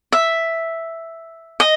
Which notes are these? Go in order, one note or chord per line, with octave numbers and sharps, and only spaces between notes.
E5
D#5